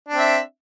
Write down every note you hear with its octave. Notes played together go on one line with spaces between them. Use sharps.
C4 D4 E5